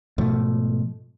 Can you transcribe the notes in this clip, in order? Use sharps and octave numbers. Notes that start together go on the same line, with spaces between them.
G#2 B2 F3 A3